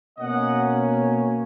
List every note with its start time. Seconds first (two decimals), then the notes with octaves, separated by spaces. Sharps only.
0.18 B2 A#3 C#4 D#5 F#5